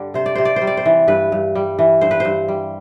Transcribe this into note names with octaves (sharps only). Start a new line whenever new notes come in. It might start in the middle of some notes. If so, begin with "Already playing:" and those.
Already playing: G2 D3 G3
C3 C5
D5
C3 C5
D5
C5
G3
D5
C5
E3
G2 B4
G2
G3
E3
G2 C5
B4
G2 C5
G3